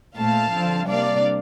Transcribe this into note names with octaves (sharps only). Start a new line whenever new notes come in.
A#2 A3 C4 F5 A5
D3 F3 C4
C3 G3 A#3 D4 D5 F5